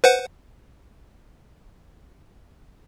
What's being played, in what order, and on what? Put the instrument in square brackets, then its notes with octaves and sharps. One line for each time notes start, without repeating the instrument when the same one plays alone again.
[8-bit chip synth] B4 C5 F#5